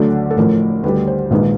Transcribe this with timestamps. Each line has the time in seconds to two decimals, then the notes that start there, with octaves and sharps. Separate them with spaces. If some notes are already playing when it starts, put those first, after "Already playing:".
Already playing: D2 D3 F#3 A3 D4
0.31 A4
0.37 A1 A2 F3 A3 A#4
0.83 D2 D3 G3 B4
1.07 C5
1.31 A#1 G#2 D#3 G#3 B4